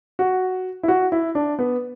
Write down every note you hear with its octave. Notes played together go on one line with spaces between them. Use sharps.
F#4
E4
F#4
E4
D4
B3